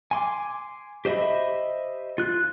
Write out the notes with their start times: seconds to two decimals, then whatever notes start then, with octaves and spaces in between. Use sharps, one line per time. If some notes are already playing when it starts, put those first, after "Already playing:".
0.11 G#5 C6 D6
1.05 G4 C5 D#5 E5 B5
2.18 F4 F#6